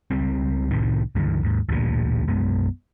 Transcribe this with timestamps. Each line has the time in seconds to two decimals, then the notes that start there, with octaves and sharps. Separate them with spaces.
0.11 C#2 G3 C4
0.71 C2 A2 C3 D#3
1.15 C#2 G2 D3 E3
1.43 D#2 G#2
1.69 A1 D2 G2 A#2
2.28 B1 F#2 G#3 B3